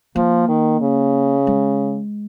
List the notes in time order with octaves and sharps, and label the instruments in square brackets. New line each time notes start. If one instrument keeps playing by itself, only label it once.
[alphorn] F3 [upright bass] A#3
[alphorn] D#3
C#3
[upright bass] G#3